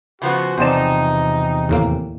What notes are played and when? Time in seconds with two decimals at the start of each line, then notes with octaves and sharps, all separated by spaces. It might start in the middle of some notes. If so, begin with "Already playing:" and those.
0.22 C#3 F3 B3 F#4
0.58 E2 C3 D#4 C5 D5 A5
1.69 D#2 A2 A#3